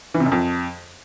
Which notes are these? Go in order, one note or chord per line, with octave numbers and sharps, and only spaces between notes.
E3
C3
F#2
F2